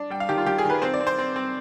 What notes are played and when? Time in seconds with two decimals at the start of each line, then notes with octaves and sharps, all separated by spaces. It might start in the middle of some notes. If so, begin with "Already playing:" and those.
Already playing: D4
0.10 G3 G5
0.20 F5
0.29 D#3 G4
0.38 F4
0.46 D#3 G4
0.58 G#4
0.65 D#3 B4
0.82 C4 C5
0.94 D5
1.00 C4
1.07 C5
1.19 C4
1.36 C4